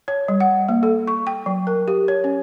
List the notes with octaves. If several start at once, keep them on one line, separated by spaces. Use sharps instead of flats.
C#5
G3
F#5
A#3
A4
C#6
G5
F#3
A#4
G4
C#5
C#4